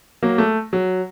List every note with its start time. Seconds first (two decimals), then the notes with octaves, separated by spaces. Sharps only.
0.23 F#3 A#3
0.38 A3
0.73 F#3